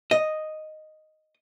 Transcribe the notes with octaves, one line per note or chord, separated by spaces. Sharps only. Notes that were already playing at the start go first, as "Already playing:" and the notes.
D#5